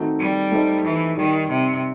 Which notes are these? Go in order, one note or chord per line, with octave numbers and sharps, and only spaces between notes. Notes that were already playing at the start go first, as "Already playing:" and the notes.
Already playing: D#3 A3 C4 D#4 F#4
G3
A3 D#4 G4 C5 D#5
E3
D#3 G3 D#4 G4 D#5
C3